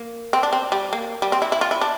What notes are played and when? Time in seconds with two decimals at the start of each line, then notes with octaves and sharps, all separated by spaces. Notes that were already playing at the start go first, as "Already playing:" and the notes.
Already playing: A#3
0.33 C4
0.43 D4
0.53 C4
0.72 G3
0.93 A#3
1.22 G3
1.32 C4
1.42 E4
1.52 E4
1.61 F4
1.71 E4
1.81 D4